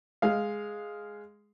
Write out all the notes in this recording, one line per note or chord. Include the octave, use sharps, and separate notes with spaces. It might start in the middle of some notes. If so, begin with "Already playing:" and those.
G#3 F5